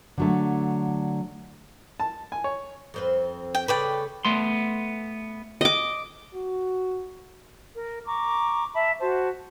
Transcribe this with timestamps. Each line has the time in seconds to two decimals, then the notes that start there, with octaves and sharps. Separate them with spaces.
0.18 D3 F#3 A3
2.00 A5
2.32 G#5
2.44 C#5
2.94 F2 C4 B4
3.55 G5
3.68 C#3 A3 B4 D5 G5
4.25 A3 B3 C6
5.61 D#5 D6
6.34 F#4
7.76 A#4
8.06 A#5 C#6 D6
8.74 E5 A5 B5
9.00 F#4 C5 A5